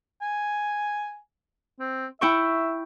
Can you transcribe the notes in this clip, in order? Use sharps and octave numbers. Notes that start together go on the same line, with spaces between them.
G#5
C4
E4 E5 G5 C#6